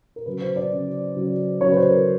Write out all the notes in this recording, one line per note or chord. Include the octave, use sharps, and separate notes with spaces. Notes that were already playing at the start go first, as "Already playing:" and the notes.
A#4
C#3 F#3 B4
C5
D5
C#3 F#3
C#3 F#3
C#3 F#3 C#5
B4
C5
A#4